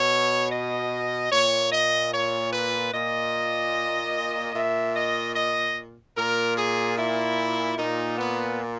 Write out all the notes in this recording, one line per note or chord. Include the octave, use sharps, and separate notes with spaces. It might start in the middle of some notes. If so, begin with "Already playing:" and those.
Already playing: B2 C#5
D#5
A#2 C#5
D#5
C#5
B4
A#2 D#5
A#2 E5
D#5
D#5
A#2 A#4
G#4
E4
A#2 D#4
B3